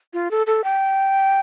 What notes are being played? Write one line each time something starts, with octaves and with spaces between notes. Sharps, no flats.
F4
A4
A4
G5